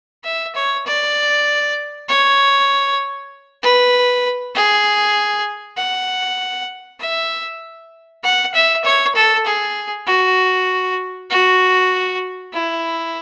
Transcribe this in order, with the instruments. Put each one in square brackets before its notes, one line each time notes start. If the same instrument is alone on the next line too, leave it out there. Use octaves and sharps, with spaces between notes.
[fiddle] E5
C#5
D5
C#5
B4
G#4
F#5
E5
F#5
E5
C#5
A4
G#4
F#4
F#4
E4